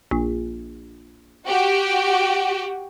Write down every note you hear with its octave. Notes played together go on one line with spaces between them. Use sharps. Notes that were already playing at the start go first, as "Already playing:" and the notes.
A#1
F#4 G4